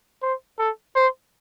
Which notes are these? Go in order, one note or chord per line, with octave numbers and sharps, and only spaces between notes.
C5
A4
C5